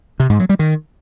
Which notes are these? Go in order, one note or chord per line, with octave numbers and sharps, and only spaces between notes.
C3
G#2
F#3
G3
D#3